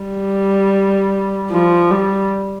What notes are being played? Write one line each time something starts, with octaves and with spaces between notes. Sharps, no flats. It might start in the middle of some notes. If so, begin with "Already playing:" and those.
Already playing: G3
F3
G3